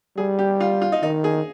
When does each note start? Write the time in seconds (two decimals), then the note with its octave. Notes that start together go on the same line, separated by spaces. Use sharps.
0.17 G3 G#4
0.39 G4
0.60 F4
0.82 F4
0.92 D#4
1.03 D#3 D#4
1.24 G#4